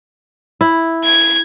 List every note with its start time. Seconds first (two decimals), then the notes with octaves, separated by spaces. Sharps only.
0.61 E4
1.04 G#6